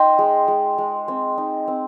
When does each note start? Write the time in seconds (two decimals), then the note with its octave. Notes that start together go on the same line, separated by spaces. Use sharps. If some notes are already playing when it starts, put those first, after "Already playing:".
Already playing: D#4 C5 D#5 G5
0.19 G#3
0.48 G#3
0.78 G#3
1.08 C4
1.38 D#4
1.68 C4